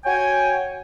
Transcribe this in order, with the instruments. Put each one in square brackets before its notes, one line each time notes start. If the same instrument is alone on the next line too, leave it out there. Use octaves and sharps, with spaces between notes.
[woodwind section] F#4 C#5 G5 G#5